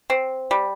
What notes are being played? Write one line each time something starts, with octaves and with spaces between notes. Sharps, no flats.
C4
G3